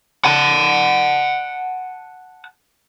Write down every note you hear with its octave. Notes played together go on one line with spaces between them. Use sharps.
F#5 A5